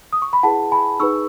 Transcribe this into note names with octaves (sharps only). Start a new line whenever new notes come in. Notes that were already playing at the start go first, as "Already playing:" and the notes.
D#6
C#6
B5
E4 G#4 B4 F#5 A5
G#5 B5
D#4 G#4 B4 C#6 E6